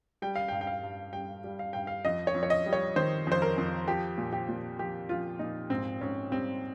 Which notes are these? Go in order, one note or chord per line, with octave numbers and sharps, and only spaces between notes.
G3 G5
F5
G2 G5
G5
F5
G2
G3 G5
G3
F5
G2 G5
F5
F2 D#5
C#5
F2
C#5
D#5
G3
C#5
D#3 C5
F2 C5
A#4
F2
F3 G4
A#2
G4
A#2
F3 G4
F3 F4
A#2 D#4
G#2 C4
G#2 C#4
G3 C4